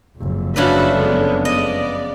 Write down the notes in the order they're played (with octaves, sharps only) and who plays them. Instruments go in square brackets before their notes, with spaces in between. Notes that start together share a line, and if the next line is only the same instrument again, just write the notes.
[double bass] F#1 F2
[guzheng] C#3 D4 B4 [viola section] F#4 E5 B5
[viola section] D3 G#3 B3
[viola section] B3 D5 [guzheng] D#5